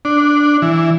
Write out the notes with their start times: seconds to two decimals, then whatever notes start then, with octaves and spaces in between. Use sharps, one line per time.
0.05 D4
0.62 E3